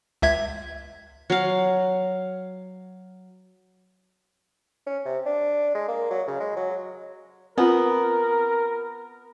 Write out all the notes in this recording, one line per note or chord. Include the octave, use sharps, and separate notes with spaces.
C#2 E5 G#6
F#3 F5
C#4
C3
D4
G#3
A#3
F#3
C#3
G#3
F#3
B3 C4 F4 A#4